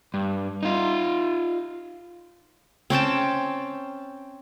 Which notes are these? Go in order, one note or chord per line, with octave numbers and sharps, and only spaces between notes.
G2
D#4 F4
C4 C#4 G5 A5